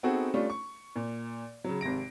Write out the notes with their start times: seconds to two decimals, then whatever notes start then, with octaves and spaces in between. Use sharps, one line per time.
0.03 B3 C4 D#4 F#4 G#4 A4
0.34 G3 A3 C#4 D4 F4
0.50 C#6
0.96 A#2
1.64 C#3 F#3
1.81 G#1 C3 A#6 D7